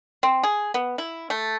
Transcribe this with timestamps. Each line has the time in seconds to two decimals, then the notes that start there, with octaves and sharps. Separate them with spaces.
0.23 C4
0.43 G#4
0.74 B3
0.98 E4
1.30 A3